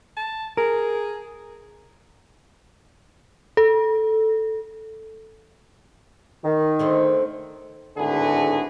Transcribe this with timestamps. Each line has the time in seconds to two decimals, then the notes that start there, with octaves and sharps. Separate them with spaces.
0.17 A5
0.57 G#4 A#4
3.57 A4
6.45 D#3
6.79 D3 A3 C4
7.98 G#1 A2 D3 F#4 G#4 B4